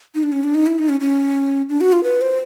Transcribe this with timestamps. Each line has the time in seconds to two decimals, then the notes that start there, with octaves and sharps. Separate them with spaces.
0.15 D#4
0.23 D4
0.32 C#4
0.44 D4
0.55 D#4
0.66 E4
0.78 D#4
0.89 C#4
1.00 C#4
1.69 D4
1.81 F#4
1.93 F4
2.04 B4
2.21 C5